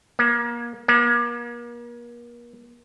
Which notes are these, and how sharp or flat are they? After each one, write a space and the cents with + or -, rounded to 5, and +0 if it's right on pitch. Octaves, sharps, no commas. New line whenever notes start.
A#3 +30
A#3 +40